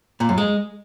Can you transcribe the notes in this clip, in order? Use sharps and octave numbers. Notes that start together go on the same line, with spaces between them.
A#2
F#2
G#3